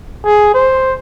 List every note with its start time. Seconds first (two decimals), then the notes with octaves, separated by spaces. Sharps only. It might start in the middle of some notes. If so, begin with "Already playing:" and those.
0.25 G#4
0.54 C5